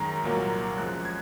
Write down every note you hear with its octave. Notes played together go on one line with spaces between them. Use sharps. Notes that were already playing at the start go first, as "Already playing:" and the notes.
Already playing: F#2 D#3 G#3 A#5
C2 A#2 F#3 A#3
F#2 F3 G#3 F#6
G#6